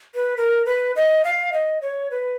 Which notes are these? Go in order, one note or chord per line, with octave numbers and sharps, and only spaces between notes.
B4
A#4
B4
D#5
F5
D#5
C#5
B4